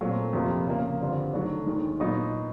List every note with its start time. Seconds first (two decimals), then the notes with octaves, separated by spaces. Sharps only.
0.01 A#2 F#3 A3 C4
0.33 F2 C3 F3 A#3
0.67 C#3 F3 A#3
1.00 G2 D3 G3 C4 F4
1.33 D#3 F#3 A3 D4
1.66 D#2 D#3 G#3
2.00 A#2 F#3 B3 D#4